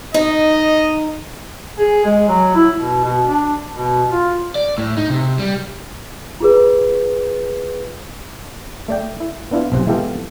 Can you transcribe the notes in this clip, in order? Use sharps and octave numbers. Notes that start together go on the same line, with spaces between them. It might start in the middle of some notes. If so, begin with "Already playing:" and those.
D#4 D#5
G#4
G#3
F#3
E4
B2
B2
D4
B2
F4
D5
A2
D#4
C3
G3
F4 G#4 B4
A3 D5 G5
E4
B3 D4 E4 F4
B1 C3 C5 F#5
E3 G#3 B3 F4 G4 A4